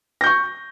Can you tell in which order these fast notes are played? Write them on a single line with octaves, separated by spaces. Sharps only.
A#6 G6 C#6